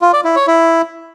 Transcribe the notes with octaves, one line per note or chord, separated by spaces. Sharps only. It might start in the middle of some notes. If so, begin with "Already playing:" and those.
F4
D5
E4
C#5
E4